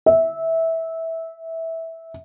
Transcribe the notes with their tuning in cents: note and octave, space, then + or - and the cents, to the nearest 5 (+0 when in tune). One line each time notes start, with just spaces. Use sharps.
E5 -15